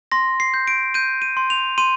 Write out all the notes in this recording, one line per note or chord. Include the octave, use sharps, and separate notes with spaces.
C6 A#6
C7
G6
D7
G6 D#7
D#7
C6
F7
C6 D#7